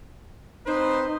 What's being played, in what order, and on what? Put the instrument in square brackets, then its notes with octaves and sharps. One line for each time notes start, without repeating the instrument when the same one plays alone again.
[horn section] C4 B4 C5 [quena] D#4